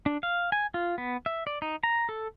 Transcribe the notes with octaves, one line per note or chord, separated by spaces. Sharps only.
D4
F5
G#5
F4
B3
E5
D5
D#4
A#5
A4